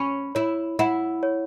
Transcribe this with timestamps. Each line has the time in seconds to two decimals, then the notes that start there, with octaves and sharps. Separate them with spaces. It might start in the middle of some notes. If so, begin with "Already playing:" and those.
Already playing: C#4 B5
0.35 E4 C#5
0.79 E4 F#5
1.23 C#5